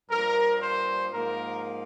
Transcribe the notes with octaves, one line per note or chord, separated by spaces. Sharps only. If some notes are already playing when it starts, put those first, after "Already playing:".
G2 F3 A#3 A#4
C5
G#2 F3 A#3 A#4